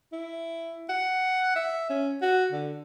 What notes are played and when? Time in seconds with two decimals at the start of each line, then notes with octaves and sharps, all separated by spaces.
0.13 E4
0.89 F#5
1.56 E5
1.90 C#4
2.22 F#4
2.52 D3